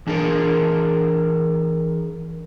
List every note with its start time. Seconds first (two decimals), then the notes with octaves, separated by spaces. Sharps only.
0.07 E3 D4 G#4 A#4